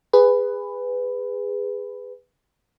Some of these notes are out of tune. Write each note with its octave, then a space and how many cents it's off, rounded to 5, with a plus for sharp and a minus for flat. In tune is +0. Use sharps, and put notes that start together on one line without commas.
G#4 -20 B4 +10